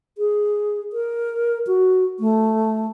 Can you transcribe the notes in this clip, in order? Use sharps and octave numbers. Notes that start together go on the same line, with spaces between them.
G#4
A#4
F#4
A3